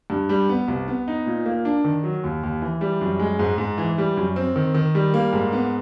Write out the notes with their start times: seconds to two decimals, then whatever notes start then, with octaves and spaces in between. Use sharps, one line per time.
0.10 G2
0.29 G3
0.49 B3
0.68 C2
0.88 B3
1.08 D#4
1.26 A#2
1.46 A#3
1.65 D4
1.84 D#3
2.04 F#3
2.24 D#2
2.43 D#2
2.62 E3
2.81 G3
3.01 F#2
3.19 G#3
3.39 G#2
3.58 G#2
3.78 E3
3.98 G3
4.17 F#2
4.36 C4
4.56 D#3
4.74 D#3
4.95 G3
5.14 A#3
5.33 G#2
5.53 B3